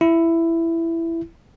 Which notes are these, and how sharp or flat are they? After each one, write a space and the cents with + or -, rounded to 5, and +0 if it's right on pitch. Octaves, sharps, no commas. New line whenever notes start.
E4 +10